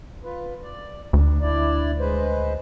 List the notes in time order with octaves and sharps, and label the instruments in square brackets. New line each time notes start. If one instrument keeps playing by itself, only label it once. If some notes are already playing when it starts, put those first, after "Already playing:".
[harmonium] F4 B4
D5
[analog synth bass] D2 [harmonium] D4
[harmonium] D4 E4 D5
G#3 B4 C5